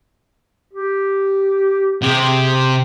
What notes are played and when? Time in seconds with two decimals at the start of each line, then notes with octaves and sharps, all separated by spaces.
0.73 G4
2.02 C3 G4 G#4